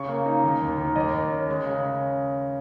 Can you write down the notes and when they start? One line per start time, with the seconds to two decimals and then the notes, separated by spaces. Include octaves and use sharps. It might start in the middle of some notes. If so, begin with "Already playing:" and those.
Already playing: C#3 C#6
0.09 A#3
0.26 D#4
0.44 D#3
0.62 D#2
0.78 D#3
0.96 D#2 D#5
1.14 D#2
1.31 C#4
1.48 G#3
1.66 C#3
1.83 C#3